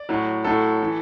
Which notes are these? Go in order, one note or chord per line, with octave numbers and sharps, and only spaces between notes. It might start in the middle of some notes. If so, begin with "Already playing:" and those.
Already playing: D5
A2 F#3
A2 F#3 A4
E3